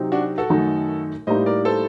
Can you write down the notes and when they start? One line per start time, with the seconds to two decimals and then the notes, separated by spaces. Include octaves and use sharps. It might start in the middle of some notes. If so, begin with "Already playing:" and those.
Already playing: C3 F#3 C4 D#4
0.12 D4 F#4
0.38 F#4 A4
0.50 F#2 D#3 A3 D#4
1.27 A2 G3 A#3 D#4 C5 D#5
1.46 A#4 D5
1.65 A4 C5